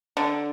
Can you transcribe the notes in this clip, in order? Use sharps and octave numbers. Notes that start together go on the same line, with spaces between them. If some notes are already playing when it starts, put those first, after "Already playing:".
D3